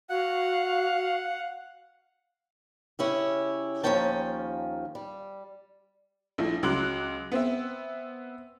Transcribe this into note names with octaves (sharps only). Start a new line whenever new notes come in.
F#4 F5 F#5
C#3 C#4 E4 G4
D#2 F3 A#3 C#4 G5 A5
G3
A#1 F3 A3 E4
C#2 F#3 C6 D6 F#6 F#7
B3 C4 E5